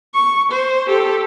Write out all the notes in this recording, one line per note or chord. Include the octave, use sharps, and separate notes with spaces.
C#6
C5
G4 A4